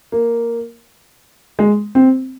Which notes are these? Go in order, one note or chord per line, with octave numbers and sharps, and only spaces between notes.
A#3
G#3
C4